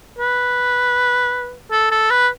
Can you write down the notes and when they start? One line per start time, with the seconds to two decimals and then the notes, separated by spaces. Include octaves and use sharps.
0.19 B4
1.71 A4
1.91 A4
2.10 B4